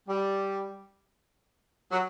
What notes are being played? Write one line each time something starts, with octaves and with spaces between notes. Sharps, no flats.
G3
F#3